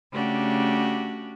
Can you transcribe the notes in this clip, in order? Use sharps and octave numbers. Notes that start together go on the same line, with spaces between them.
C#3 A3 D4 F#4 G4